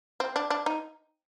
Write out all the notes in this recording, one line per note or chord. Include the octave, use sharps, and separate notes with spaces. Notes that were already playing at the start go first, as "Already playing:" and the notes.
C4
D4
D4
D#4